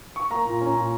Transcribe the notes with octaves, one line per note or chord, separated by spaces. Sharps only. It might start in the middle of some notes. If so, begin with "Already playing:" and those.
C#6
A#3 A#5
A#2
C#4
A#2